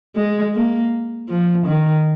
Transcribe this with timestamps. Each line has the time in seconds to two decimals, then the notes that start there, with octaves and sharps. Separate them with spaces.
0.16 G#3
0.54 A#3
1.29 F3
1.66 D#3